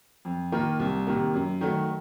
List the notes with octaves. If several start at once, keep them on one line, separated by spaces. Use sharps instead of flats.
F2
D#3 A#3 F4
C2
C3 D#3 A#3
F#2
D#3 F#3 A3